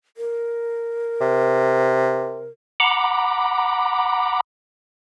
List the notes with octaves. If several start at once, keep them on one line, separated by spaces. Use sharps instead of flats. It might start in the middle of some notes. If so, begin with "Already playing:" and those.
A#4
C3
F#5 A#5 B5 D6